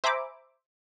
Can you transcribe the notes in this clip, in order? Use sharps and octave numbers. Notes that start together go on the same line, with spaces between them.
C5 E5 G#5 A#5 B5 D6